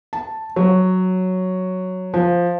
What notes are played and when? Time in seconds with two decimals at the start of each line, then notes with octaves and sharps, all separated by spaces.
0.13 A5
0.56 F#3
2.14 F3